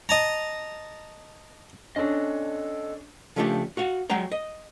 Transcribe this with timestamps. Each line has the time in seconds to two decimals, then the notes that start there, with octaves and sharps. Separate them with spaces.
0.09 D#5 A5 A#5
1.96 C#4 D4 A4 D#5
3.36 C#3 F3 A3 B3 D4 G4
3.77 F#4 F5 F#5
4.10 F#3 G#3 F#4 G5 A#5
4.32 D#5